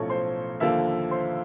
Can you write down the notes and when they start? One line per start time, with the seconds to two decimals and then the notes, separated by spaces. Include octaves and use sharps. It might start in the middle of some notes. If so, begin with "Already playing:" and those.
Already playing: B1 A2 F3 A3 C#4 A4 C#5 C#6
0.10 C5 C6
0.60 D#2 D3 F3 A#3 E5 E6
1.11 C5 C6